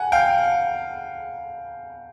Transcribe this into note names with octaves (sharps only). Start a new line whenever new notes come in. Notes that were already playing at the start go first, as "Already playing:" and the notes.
Already playing: F#5 G#5
F5 G5